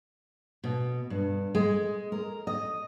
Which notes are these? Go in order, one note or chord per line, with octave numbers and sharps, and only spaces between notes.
B2
G2
G#3
A#4
D#5